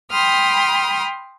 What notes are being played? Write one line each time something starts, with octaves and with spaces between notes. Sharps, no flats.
G5 B5 C6 D#6 F6